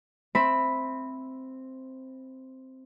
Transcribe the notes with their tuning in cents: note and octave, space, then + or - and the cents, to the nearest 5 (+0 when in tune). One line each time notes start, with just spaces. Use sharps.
C4 +0 E5 +0 B5 +0